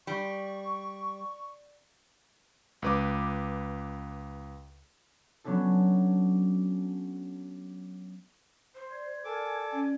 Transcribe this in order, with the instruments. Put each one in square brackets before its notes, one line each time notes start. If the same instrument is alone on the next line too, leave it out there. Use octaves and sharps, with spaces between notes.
[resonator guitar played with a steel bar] G3 [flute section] C#6
[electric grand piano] C#2 B4 D6
[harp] F#3 B3 C#4 D4 A4
[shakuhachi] C5 [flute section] C6
[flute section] D5 G#6
[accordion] A4 D6 [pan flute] A#4 [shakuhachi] G#5
[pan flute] C#4 [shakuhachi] G#5